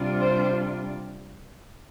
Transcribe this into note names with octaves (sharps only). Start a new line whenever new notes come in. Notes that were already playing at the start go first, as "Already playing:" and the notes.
Already playing: C3 G3 D4 F4
C5